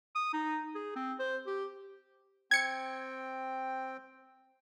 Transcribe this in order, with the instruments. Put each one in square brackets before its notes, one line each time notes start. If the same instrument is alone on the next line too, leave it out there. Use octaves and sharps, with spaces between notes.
[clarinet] D#6
D#4
G#4
C4
C5
G4
[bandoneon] C4 G5 [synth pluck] G#6 C#7